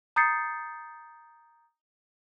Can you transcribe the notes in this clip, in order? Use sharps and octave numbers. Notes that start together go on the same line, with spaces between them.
A#5 D#6 G6 A6 C7 C#7